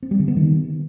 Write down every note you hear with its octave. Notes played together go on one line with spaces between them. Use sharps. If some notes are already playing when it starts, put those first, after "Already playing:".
C4
G3
D3
B3
D#3